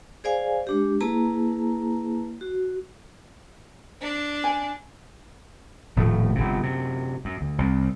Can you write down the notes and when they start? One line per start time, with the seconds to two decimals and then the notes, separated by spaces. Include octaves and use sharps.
0.24 G#4 C5 D5 F5 G#5
0.67 G#3 D4 G4
1.01 A#3 E4 G#4 B4 A5 A#5
2.41 F#4
4.02 D4
4.44 G#5
5.96 D#1 A2 F3 A3
6.35 G1 C3
6.61 F#2 C3
7.25 F#2
7.41 D2
7.58 C2